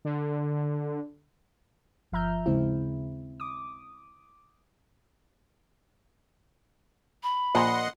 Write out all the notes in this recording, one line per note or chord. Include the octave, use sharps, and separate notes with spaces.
D3
G1 F3 E5 A#5 F6 G6
D#2 C#3 G#3 C4 E4
D6 D#6
B5
A#1 A#2 D#5 F#5 C6